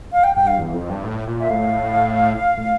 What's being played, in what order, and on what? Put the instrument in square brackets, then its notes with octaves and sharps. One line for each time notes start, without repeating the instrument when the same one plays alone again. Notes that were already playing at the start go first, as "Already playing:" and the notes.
[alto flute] F5
G5
[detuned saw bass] G2 [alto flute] G5
[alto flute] F5
[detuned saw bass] E2
F2
G2
A2
A#2
[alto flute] E5
[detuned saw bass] A2 [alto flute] F5
[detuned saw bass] A2